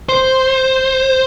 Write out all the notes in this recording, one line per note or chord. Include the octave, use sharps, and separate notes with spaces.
C5